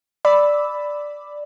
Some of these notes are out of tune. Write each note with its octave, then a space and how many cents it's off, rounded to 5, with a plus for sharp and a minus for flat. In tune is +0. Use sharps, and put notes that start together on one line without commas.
D5 +0 B5 +5 E6 -10